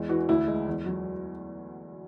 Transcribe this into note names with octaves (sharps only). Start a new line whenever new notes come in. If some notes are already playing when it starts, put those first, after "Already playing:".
Already playing: E2 G#3
E3 F#4
D2 E4
G#3
E2
F#3